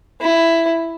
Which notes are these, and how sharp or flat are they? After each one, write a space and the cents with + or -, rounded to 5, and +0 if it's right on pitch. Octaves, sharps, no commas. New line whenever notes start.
E4 +10